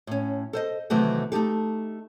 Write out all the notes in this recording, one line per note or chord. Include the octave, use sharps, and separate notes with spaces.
A2 C#4
A4 C5 D#5
C3 D#3 E3 F#3 A3 B3
A3 D#4 G4 A4